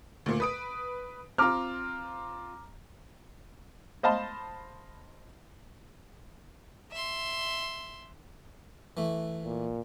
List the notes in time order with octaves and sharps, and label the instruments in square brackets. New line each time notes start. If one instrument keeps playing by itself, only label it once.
[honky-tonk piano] D2 A#2
B4 D#6 D7
[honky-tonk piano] C4 F4 [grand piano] A#5 D6 F6
[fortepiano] C5 D#5 F5 A5 B5
[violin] E5 C6
[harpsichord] E3 A3
[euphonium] A#2